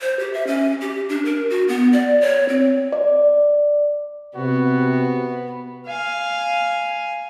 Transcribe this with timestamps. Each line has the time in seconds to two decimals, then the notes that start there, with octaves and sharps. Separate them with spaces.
0.01 C5
0.19 G4
0.34 E5
0.47 C#4
0.81 G4
1.09 D4
1.25 A#4
1.50 F#4
1.69 B3
1.93 D5
2.21 C#5
2.49 C4
2.92 D5
4.36 C3 B3 F#4
5.86 F5 G#5